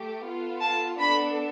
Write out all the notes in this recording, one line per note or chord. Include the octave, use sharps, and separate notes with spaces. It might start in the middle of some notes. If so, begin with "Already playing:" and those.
Already playing: A3 G4
B3 F4 A4
A5
B3 D4 A4 B5